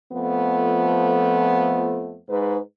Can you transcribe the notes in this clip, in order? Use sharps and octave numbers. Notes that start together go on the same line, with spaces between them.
F2 F3 A3 B3
G#2 B4